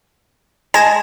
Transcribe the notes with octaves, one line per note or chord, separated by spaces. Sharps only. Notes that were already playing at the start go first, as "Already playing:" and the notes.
G#3 A5 G#6 A#6